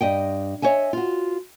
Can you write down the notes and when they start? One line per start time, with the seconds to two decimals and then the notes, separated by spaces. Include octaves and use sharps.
0.01 G2 D#5 G5
0.62 C#5 D#5 E5 G#5
0.93 F4 F#4